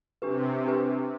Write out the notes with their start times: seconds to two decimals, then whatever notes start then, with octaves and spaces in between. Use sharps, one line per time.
0.22 C3 D4 G4 B4
0.65 D4 G4 B4